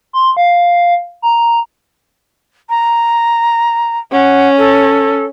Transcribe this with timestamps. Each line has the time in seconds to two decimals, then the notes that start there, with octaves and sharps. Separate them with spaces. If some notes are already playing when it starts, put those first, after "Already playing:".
0.13 C6
0.37 F5
1.22 A#5
2.69 A#5
4.13 C#4 F#5
4.58 A4